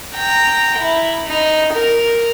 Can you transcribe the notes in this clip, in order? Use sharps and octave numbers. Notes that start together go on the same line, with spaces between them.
G5 A#5
E4
D#4
A#4